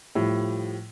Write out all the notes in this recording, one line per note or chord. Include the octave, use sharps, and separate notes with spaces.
A2 F3 G3